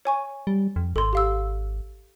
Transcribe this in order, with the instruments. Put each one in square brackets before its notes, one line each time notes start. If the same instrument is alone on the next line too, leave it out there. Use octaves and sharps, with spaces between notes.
[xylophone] C#5 G#5 C#6
[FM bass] G3
F2
[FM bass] G#1 [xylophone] A4 C6
[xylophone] G4 F5 E6